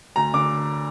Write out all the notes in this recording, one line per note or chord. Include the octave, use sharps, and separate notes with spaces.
D2 A#5
D3 D6